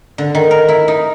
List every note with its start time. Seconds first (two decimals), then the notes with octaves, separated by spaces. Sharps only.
0.18 D3
0.35 D#3
0.51 A#4
0.68 E4
0.88 D#4